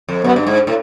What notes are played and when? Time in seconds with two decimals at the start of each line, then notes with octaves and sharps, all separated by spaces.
0.09 F2
0.24 F#2 B3
0.36 G2
0.47 G#2
0.67 A2